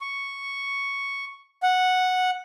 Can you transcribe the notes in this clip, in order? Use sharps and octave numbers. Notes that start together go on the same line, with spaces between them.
C#6
F#5